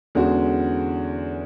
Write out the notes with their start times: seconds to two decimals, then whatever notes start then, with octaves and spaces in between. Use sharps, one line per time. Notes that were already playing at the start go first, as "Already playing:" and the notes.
0.15 E2 D3 G#3 C#4 F#4